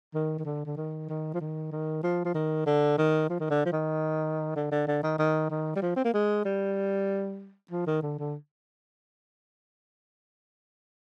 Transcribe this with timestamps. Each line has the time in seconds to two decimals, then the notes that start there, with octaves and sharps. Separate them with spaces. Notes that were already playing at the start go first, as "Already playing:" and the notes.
0.14 D#3
0.39 D#3
0.45 D3
0.66 D3
0.77 D#3
1.09 D#3
1.34 F3
1.41 D#3
1.72 D#3
2.03 F3
2.25 F3
2.35 D#3
2.66 D3
2.98 D#3
3.30 F3
3.40 D#3
3.50 D3
3.65 F3
3.72 D#3
4.56 D3
4.72 D3
4.88 D3
5.03 D#3
5.19 D#3
5.50 D#3
5.76 G3
5.82 F3
5.96 C4
6.05 A#3
6.14 G#3
6.45 G3
7.71 F3
7.87 D#3
8.03 D3
8.19 D3